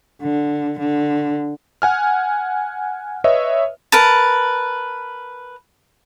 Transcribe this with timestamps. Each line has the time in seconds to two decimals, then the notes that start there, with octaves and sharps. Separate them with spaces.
0.22 D3
0.80 D3
1.82 F#5 G#5 F6
3.24 B4 C#5 D#5 E5
3.92 A#4 B4 A5